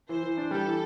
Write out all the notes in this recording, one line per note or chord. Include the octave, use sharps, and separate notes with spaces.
E3 C5
E3
D4
G3 A4
E3